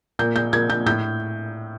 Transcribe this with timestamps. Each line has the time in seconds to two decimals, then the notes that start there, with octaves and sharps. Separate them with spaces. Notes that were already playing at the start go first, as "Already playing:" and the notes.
0.19 A#2 G6
0.36 A#2 G6
0.53 A#2 G#6
0.70 A#2 G6
0.86 A2 G6